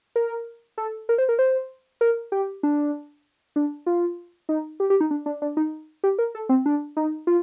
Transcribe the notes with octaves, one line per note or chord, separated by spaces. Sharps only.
A#4
A4
A#4
C5
A#4
C5
A#4
G4
D4
D4
F4
D#4
G4
G4
D#4
D4
D4
D4
D#4
G4
A#4
A4
C4
D4
D#4
F4